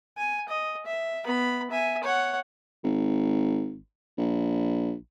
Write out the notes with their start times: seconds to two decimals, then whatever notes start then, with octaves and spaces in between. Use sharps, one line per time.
0.17 G#5
0.49 D#5
0.86 E5
1.24 B3 B5
1.71 E5 G#5
2.03 C#5 F#5
2.84 G#1
4.18 A#1